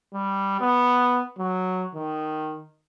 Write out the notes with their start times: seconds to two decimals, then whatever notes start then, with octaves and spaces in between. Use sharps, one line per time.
0.14 G3
0.61 B3
1.38 F#3
1.95 D#3